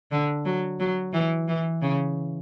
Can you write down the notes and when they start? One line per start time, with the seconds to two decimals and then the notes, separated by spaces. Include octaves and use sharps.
0.12 D3
0.45 F#3
0.80 F#3
1.13 E3
1.48 E3
1.82 C#3